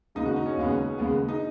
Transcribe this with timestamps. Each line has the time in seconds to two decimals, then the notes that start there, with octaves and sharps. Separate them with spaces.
0.15 D#2 C#3 G#3 B3 D#4
0.26 F#4
0.36 D#4
0.46 C#4
0.57 D#2 C#3 G#3 B3
0.98 D#2 C#3 G#3 B3
1.28 D#4